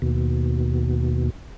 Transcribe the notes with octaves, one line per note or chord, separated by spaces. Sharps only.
D#2 B2